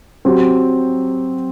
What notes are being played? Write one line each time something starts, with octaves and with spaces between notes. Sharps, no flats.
F#3 C4 G4